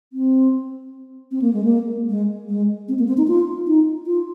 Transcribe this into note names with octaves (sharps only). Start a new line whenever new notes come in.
C4
C4
A#3
G#3
A#3
G#3
G#3
C4
A#3
C4
D#4
F4
D#4
F4